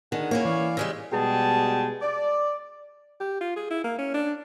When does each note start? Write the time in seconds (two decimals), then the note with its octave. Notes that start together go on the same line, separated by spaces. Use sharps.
0.12 D3 D#3 G#4 F#5
0.31 A#3 C#4 E4 C#5
0.45 E3 D5 F5
0.77 C#3 G3 G#3 G#4 E6 F6
1.12 B2 G3 G#3 G#4 G5 A5
2.02 D5
3.20 G4
3.41 F4
3.56 G#4
3.70 E4
3.84 A#3
3.98 C#4
4.14 D4